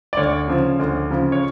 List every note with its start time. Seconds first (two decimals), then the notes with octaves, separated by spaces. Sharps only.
0.13 D5
0.17 D2 C#5
0.48 C#3 F3
0.79 D2
1.11 C#3 F3
1.32 C#5